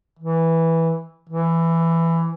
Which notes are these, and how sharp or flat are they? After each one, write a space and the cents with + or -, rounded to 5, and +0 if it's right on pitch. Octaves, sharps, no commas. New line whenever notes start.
E3 -5
E3 +10